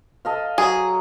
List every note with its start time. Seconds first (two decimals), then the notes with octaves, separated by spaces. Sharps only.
0.25 A4 D#5 F5
0.58 F#3 G#4